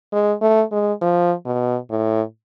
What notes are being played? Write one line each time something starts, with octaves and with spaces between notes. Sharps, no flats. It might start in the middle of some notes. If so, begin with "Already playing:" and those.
G#3
A3
G#3
F3
B2
A2